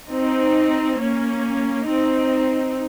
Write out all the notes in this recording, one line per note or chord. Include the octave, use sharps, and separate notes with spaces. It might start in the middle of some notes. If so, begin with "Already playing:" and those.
C4 D#4
A#3 C#4
C4 D#4